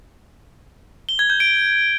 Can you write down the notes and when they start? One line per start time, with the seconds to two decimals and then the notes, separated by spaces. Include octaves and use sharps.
1.09 G7
1.19 G#6
1.30 G6
1.40 D7